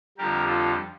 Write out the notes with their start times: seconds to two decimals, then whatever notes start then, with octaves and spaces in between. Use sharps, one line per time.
0.18 F2 D3 G3 G4 A#4
0.46 F4 A4